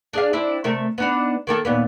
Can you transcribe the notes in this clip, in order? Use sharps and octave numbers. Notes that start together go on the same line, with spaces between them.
D4 G#4 F5
C4 D4 E4
C3 A3 A#4
B3 D4 D#4
D#3 A#3 A4
D#2 A#2 B3